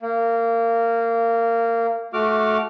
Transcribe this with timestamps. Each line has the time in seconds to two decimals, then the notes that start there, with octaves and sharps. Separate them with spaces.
0.02 A#3
2.13 A3 F#4 D6 F6